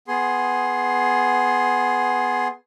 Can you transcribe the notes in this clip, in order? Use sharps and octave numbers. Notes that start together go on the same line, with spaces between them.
B3 G#4 C6